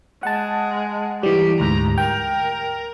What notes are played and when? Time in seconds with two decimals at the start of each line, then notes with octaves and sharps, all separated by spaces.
0.23 G#3 F#5 A5
1.23 E3 G3 G4
1.60 D2 G#2 A#5
1.98 A#4 G5